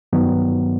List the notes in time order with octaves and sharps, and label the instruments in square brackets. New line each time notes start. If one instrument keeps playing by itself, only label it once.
[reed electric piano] G2 D#3 F#3 B3